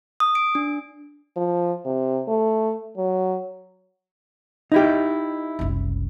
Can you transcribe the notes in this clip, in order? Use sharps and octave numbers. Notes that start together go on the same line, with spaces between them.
D#6
D7
D4
F3
C3
A3
F#3
D#4 E4 G4
F#1 C2